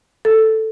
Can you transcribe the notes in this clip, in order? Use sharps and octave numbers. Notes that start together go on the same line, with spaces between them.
A4